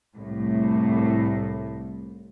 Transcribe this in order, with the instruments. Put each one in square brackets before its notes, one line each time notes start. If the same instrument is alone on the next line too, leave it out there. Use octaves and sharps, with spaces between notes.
[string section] C2 A2